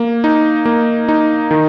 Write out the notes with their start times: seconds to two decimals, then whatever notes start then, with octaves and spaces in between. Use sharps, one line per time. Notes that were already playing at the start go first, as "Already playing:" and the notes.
Already playing: A#3
0.24 D#4
0.65 A#3
1.08 D#4
1.51 D#3